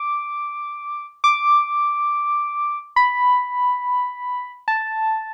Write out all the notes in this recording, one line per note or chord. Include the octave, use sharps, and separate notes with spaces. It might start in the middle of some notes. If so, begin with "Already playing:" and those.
Already playing: D6
D6
B5
A5